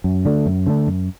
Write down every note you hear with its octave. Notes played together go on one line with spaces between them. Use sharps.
F#2
D3 A3 D4
F#2
D3 A3 D4
F#2